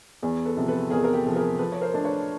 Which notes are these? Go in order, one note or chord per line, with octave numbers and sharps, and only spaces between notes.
E2
A4 B4
C3 F3
A4 B4
E2 G#4 A#4
A#4
G4 A4
C3 F3 A4
G#4 A#4
F3 A4 B4
C#5
A#4 C5
A3 D4
B4 C#5